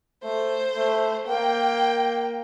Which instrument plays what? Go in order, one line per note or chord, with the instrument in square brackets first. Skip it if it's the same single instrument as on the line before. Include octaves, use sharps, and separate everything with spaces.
[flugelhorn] A3 [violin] C5
[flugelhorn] A3
[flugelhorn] A#3 [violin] G5